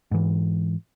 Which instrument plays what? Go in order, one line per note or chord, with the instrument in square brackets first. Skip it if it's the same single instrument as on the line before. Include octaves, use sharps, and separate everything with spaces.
[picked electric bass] G#2 E3